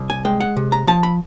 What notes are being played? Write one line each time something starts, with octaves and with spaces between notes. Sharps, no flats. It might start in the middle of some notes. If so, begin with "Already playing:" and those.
Already playing: C2
G#5
G#3 G5
F#5
C3
A#5
F3 A5
B5